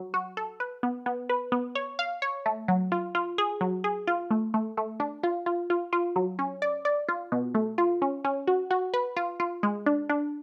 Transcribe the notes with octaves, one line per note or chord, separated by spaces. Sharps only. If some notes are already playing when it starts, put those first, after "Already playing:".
Already playing: F#3
F#4
A4
B4
B3
B3
B4
B3
C#5
F5
C#5
A3
F#3
F4
F4
G#4
F#3
G#4
F4
A3
A3
A3
D4
F4
F4
F4
F4
F#3
C#4
D5
D5
F4
B2
A3
F4
C#4
C#4
F#4
F#4
B4
F4
F4
G#3
D4
D4